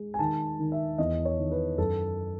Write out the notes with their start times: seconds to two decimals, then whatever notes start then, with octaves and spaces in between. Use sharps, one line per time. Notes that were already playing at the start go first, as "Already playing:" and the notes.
Already playing: G#3
0.14 G#5
0.19 D#3 A5
0.59 D#3
0.72 E5
0.98 E2 D#5
1.25 C#5
1.38 D#3
1.51 B4
1.78 F#2 A4